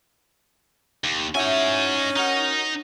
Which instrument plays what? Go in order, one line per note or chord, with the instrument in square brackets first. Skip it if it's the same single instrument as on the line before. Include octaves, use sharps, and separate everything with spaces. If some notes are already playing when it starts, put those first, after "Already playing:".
[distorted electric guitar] D#2
[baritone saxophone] C#4 [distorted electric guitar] D#4 G#5 [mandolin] E4 F#4
[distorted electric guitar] D#4 [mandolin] F#4 A#4